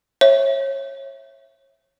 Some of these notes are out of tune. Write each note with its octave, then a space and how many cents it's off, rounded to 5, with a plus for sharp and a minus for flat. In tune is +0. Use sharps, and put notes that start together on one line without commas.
C#5 -30 E5 +0